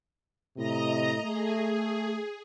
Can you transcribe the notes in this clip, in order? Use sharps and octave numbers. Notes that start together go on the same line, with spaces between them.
A2 C3 E4 D#5 A#5
A3 G#4